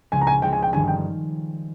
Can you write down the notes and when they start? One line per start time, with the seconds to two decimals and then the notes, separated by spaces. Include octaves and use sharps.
0.12 C#2 C#3 F3 G#3 C#4 G#5
0.22 A#5
0.27 G#5
0.42 C#2 C#3 F3 G#3 C#4 G5
0.53 G#5
0.63 G5
0.73 G1 G2 D#3 G3 C#4 G#5
0.88 G5